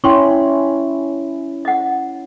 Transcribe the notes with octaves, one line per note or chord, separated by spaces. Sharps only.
C#4 E4 G5 C6 C#6
D#5 F#5